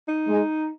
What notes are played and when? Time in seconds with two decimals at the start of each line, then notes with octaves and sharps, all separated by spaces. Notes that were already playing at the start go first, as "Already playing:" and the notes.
0.08 D#4
0.28 G#3